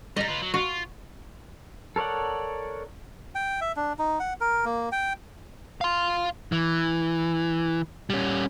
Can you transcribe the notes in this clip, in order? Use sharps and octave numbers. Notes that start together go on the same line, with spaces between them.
G3 D#5 A#5
F4 B4
F#3
F4 F#4
A4 A#4 C#5 D5 F#5
G5
E5
D4
D#4
F#5
A#4
A#3
G5
F5 C6
E3
G3 C#4